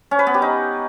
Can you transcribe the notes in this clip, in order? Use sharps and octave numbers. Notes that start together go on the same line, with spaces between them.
C#4
B4
B3
G4
D#4